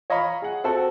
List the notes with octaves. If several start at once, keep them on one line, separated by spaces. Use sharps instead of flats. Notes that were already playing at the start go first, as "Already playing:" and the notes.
C#5 D#5 F5 A#5 B5 C#6
G#4 F#5
C4 F#4 A4